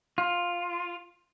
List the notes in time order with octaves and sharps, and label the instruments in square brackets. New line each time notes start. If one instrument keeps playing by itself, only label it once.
[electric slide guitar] F4